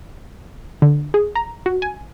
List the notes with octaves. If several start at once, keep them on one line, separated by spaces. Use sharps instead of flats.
D3
G#4
A#5
F#4
G#5